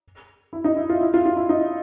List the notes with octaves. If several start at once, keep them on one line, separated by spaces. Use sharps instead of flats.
E4
D#4
E4
F4
E4
F4
F4
E4
D#4